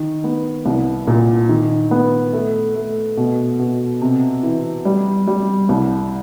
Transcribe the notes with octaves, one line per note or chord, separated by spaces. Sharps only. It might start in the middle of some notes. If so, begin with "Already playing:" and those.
Already playing: D#3
B3
C2
A#2
D#3
B3
A3
A3
B2
B2
C3
E3
G3
G3
C2